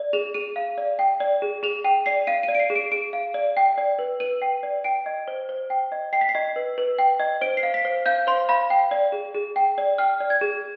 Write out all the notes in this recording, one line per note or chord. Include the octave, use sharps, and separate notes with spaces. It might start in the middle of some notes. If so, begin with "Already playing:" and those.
Already playing: D5
G#4 F7
G#4 D#7
F5
D5
G5
D5
G#4
G#4 F7
G5 D#7
D5 C7
F5 D#7
D#7
D5
D7
C7
G#4
D7
G#4 D7
F5
D5
G5
D5
B4
B4 D#7
G5
D5
G5 D7
D#5
C5
C5
G5
D#5
G5 C7
B6
C7
D#5
B4
B4
G5
D#5
C5 D7
C7
F5
B6
C5
F5 G6
C5 C6
F5 B5
G5
D5
G#4
G#4
G5
D5
G5 F6
D5
G#6
G#4